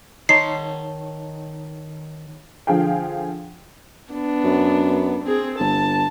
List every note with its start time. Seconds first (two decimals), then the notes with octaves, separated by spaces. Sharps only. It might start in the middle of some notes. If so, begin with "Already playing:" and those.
0.29 D#3 D#4 C#5 A5 C6 C7
2.67 D3 F3 G#4 F5 G5
4.13 B3 D4
4.44 F#2
5.25 C4 G#4
5.59 G1 A5